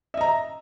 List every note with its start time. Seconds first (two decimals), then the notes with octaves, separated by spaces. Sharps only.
0.14 E5
0.17 D#5
0.21 A#5